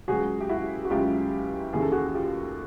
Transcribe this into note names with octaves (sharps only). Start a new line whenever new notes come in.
C#2 C#3 F#3 F#4 G#4
G4
E4 F#4
F#4
C#2 C#3 F#3 F4 G4
D#2 C#3 E3 G#4
A4
F#4 G#4
F4 G4